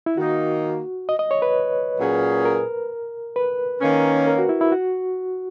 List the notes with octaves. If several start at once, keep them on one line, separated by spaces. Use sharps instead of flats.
E4
D#3 A#3 D#4 F#4
D#5
D#5
C#5
B4
A#2 F#3 C#4 G#4
A#4
B4
D#3 A#3 C#4
A#4
F#4
E4
E4
F#4